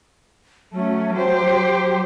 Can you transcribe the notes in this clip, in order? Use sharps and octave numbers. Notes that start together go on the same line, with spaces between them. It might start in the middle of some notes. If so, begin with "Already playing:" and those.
F#3 A3 C#4
F#3 G4 C5
F#3